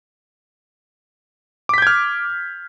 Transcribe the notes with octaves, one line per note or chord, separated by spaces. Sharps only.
D6 F6 G6 G#6 B6